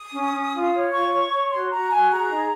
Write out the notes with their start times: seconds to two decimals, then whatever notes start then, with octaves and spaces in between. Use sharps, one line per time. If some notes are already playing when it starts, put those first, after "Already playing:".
Already playing: D#6
0.14 C#4
0.33 C#4
0.52 F4
0.72 C#5
0.92 F4 C#6
1.12 C#5
1.31 C#5
1.51 F#4 C6
1.71 F#4 A#5
1.91 F#4 G#5
2.10 G#4 A#5
2.30 D#4